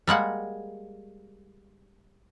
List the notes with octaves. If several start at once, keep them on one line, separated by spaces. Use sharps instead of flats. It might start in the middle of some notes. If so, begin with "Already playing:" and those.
G3 G#3 A#3 F#5